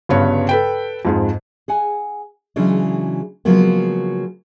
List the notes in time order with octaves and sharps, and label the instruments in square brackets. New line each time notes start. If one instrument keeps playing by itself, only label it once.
[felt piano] G1 G2 C#3 B3 C#5
A4 B4 G5
F2 G#2 G#3
[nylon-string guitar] G#4 F#5 G#5
C#3 E3 F#3 G#3 C#4 D4
C#3 F3 F#3 G#3 A#3 B3